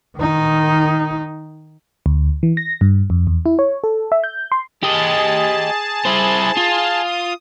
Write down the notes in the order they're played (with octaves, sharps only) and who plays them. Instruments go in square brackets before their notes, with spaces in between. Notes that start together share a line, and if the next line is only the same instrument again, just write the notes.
[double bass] D#3 D#4
[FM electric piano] D2
E3
A#6
G2
F2
E2
E4
C#5
A4
E5
G6
C6
[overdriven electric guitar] G4 D#5 [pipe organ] G#4 A5
[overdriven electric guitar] E4 C5
F4
[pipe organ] D#6